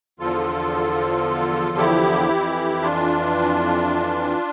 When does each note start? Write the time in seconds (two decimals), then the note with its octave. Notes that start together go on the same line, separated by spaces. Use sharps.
0.19 E2 D3 F3 F4 A4
1.77 E4 G4
2.29 F2 E3
2.82 D4 F4